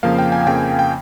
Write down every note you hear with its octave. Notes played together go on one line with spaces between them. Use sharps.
F2 C#3 F3 A#3 F5
G5
G#5
F2 C#3 F3 A#3 G5
G5